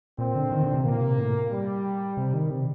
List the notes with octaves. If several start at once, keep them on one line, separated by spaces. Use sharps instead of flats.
A#2 C4
D3
D#3
D3
C3
A#2 A#3
C3
A2
G3
C3
D#3
C3